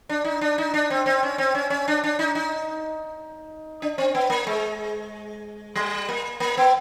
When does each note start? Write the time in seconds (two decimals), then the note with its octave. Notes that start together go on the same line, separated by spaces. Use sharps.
0.09 D4
0.24 D#4
0.41 D4
0.58 D#4
0.74 D4
0.90 C4
1.06 C4
1.23 C#4
1.38 C4
1.55 C#4
1.70 C#4
1.88 D4
2.04 D4
2.19 D#4
2.35 D#4
3.82 D4
3.98 C4
4.15 B3
4.30 A#3
4.47 G#3
5.76 G3
6.09 A#3
6.40 A#3
6.57 B3